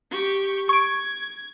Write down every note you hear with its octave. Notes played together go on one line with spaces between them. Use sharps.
G4 C#6
C#6 G#6 D7